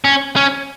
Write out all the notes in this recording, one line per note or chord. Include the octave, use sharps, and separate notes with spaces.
C#4
C#4